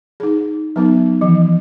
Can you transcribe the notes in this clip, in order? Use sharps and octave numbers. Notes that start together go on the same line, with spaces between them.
D#4 G#4
F#3 B3 D#4
E3 F3